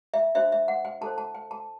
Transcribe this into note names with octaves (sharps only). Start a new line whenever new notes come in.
E5
D4 F#4 C5 E5
E5
F#5
G5
E4 A4 C5 A5
A5
G5
A5